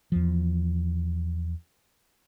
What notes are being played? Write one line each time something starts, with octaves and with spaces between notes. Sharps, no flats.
E2 F3